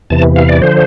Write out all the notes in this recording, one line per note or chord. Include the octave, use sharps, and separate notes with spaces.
E2 C3 E3 A5
F5
D5
D3 F3 C5